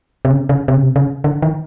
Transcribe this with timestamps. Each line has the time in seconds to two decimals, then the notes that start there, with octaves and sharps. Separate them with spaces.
0.25 C3
0.31 C#3
0.49 C#3
0.68 C3
0.75 C#3
0.83 C3
0.96 C#3
1.24 D3
1.42 D#3